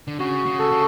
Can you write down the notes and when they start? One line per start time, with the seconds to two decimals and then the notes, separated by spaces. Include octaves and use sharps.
0.07 D3
0.19 C#3 F#4
0.46 C#3
0.59 A4
0.72 C#3